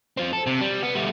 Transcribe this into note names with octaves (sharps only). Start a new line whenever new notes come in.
F3 C4
A4
C3
G3
B3
G3 A3